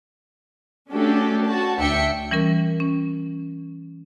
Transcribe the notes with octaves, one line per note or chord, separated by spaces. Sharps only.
A3 C#4 D4 F#4 G4 A4
F#4 A5
D2 D4 E5 G5 C#7
E3 G3 C#4 A#4
C#4